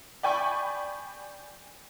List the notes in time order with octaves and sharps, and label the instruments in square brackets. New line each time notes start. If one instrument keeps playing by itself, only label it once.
[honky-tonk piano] D5 G5 G#5 B5 C#6